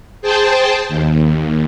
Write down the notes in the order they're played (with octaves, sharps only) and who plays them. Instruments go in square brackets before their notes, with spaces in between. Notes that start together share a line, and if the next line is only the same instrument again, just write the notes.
[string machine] G#4 C5 G5 A5
D#2